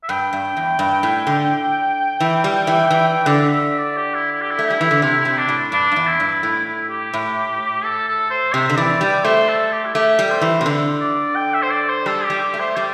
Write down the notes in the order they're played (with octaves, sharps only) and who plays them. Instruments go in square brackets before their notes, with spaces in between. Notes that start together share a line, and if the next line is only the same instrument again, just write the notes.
[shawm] E5
[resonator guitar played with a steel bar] G2 [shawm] G5
[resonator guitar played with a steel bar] G2
E2
G2
A2
D3
E3
G3
E3
E3
[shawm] G5
[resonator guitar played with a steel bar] D3 [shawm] D5
[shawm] E5
E5
D5
G4
E4
E4
G4
E4
[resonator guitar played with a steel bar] A3
[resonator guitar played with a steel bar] G3 [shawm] E4
[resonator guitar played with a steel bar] E3
D3
[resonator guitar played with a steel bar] C3 [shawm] E4
[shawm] E4
[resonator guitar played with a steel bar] C3
[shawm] D4
[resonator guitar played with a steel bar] A2
[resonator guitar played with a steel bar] G2 [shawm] D4
[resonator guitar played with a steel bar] G2
E2
[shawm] E4
[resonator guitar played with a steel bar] G2
[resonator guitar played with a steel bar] A2 [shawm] E4
[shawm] E4
G4
[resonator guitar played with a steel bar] A2
[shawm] A4
A4
C5
[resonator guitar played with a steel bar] C3 [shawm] E5
[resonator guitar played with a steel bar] D3 [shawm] E5
[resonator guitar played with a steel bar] E3 [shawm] D5
[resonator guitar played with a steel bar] G3 [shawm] D5
[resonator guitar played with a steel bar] A3 [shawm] C5
[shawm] A4
G4
E4
[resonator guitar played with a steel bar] A3 [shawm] G4
[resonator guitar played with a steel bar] G3
[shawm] C5
[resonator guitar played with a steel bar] E3
C3
D3
[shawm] D5
G5
E5
C5
D5
C5
[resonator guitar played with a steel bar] G3 [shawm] A4
[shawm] G4
[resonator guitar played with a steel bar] G3
[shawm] G4
[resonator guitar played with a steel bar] A3
[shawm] C5
[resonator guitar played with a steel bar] G3 [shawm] D5